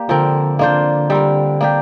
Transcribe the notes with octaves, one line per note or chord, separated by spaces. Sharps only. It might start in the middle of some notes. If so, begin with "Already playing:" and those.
Already playing: A#3 G4 D5
D3 F3 C4 A#4
D3 A#3 D4 F4 C5
G3 C4 A#4
A#3 D4 G4